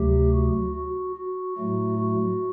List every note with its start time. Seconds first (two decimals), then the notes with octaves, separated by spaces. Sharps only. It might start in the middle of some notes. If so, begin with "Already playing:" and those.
Already playing: D2 C3 F#3 A3 G4
0.33 F#4
0.75 F#4
1.17 F#4
1.57 A2 F#3 A3 F#4
1.99 F#4